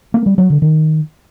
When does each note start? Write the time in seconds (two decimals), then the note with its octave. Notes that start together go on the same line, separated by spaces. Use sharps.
0.14 A#3
0.26 G3
0.38 F#3
0.50 D3
0.62 D#3